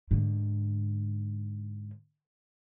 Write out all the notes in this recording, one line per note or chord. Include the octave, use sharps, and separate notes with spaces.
G#2 D3